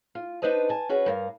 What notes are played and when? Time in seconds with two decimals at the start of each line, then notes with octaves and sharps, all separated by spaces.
0.15 F4
0.42 D4 D#4 B4 C5 D#5 A5
0.69 G#5 A5
0.89 C#4 F#4 G#4 B4
1.06 G2 A#4 F5